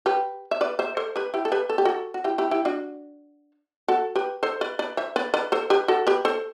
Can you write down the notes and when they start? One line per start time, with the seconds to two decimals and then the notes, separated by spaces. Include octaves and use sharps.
0.06 G4 B4
0.51 E5
0.61 B4 D5
0.79 C5 E5
0.97 A4 C5
1.16 G4 B4
1.34 E4 G4
1.45 A4
1.52 G4 B4
1.70 A4
1.78 G4
1.85 F#4 A4
2.14 F#4
2.24 E4 G4
2.38 E4 G4
2.51 E4 G4
2.65 D4 F#4
3.88 F#4 A4
4.16 G4 B4
4.43 A4 C5
4.61 B4 D5
4.79 B4 D5
4.97 C5 E5
5.16 B4 D5
5.34 B4 D5
5.52 A4 C5
5.70 G4 B4
5.88 F#4 A4
6.07 G4 B4
6.25 A4 C5